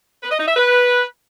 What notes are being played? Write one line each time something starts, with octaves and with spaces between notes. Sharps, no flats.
B4
D#5
D#4
E5
B4